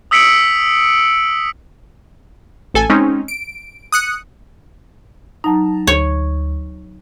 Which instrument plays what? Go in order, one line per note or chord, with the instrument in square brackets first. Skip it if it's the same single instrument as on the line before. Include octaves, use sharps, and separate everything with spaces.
[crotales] D#6 E6 B6 C#7 D7 F#7
[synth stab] A1 A4 G#5
G#3 C4 C#4 D#4
D7
D#6 F#6 C#7
[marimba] F#3 D#4 [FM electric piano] A5 A#5
[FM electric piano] D2 [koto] C#5